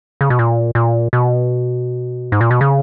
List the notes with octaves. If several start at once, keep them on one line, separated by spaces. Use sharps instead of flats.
C#3
B2
A#2
A#2
B2
G#2
A#2
B2
C#3